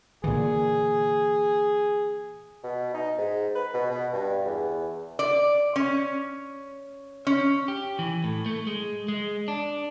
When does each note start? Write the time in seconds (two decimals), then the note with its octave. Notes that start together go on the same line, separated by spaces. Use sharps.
0.24 A#2 D3 E3 G#4
2.64 B2
2.94 D#4
3.18 G#2
3.55 B4
3.74 B2
3.90 B2
4.13 G2
4.46 E2
5.19 D5
5.76 C#4
7.27 C#4
7.68 G4
7.99 E3
8.24 A2
8.46 A3
8.67 G#3
9.08 G#3
9.48 D4